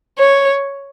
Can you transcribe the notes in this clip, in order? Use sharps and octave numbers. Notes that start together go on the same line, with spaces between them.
C#5